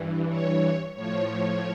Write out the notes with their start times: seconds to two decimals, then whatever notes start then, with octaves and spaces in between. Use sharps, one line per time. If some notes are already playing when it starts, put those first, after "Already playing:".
Already playing: G2 E3
0.29 C#5
0.94 A2 F3 C#5